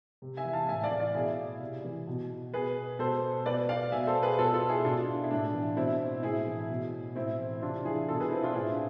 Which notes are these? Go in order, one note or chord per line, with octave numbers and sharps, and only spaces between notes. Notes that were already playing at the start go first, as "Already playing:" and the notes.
C3
E5 G#5
E3
F5 A5
A2 E5 G#5
D5 F5
E3
D5 F5
B2 E4 G#4
C3
E3
B2
B2 G#4 B4
B2 A4 C5
B2 B4 D5
D5 F5
B2 E5 G#5
A4 C5
G#4 B4
B2 F4 A4
F4 A4
E4 G#4
B2 D4 F4
E4
A2 D4
E3
B2 C4 E4
A2 E4 G#4
E3
B2
A2 C4 E4
E3
C3 D4 F4
E3 E4 G#4
B2 F4 A4
G#4 B4
C4 E4
D4 F4
A2 E4 G#4